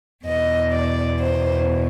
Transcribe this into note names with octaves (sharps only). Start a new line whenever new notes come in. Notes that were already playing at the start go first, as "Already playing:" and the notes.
E2 B2 D#5
D5
C5